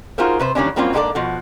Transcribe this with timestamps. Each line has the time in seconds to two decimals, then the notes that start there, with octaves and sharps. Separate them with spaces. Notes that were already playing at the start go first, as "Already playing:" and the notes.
0.18 D#4 F4 F#4 G#4 A#4 C5
0.39 C3 B4 C5
0.55 D#3 E3 G3 A#3 C#4 D4
0.76 F#3 G3 A#3 C4 C#4 F4
0.93 G#2 A#3 D4 G4 A4 D5
1.15 B2 F3 F#4